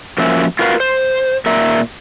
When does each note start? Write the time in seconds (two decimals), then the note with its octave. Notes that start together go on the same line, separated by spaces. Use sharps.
0.18 F3 A#3 C#4 F#4 E5
0.59 F4 F#4 A#4 B4 C#5 F5
0.80 C5
1.46 A#2 A#4 E5